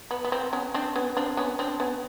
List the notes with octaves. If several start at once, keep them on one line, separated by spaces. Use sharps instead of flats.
B3
B3
C4
B3 C#4
C4 D4
B3 C#4
C4 D4
B3 C#4
C4 D4
B3 C#4